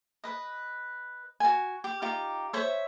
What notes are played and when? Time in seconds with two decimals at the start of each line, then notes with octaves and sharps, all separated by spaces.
0.24 B4 D#5
1.40 F#4 G#5
1.84 G4
2.02 D#4 F4 G4
2.53 C5 C#5 E5